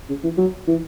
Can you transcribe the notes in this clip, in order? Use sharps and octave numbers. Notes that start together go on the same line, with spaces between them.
C#3
E3
F#3
E3